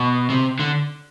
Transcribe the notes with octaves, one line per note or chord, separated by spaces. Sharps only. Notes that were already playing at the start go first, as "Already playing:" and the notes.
Already playing: B2
C3
D3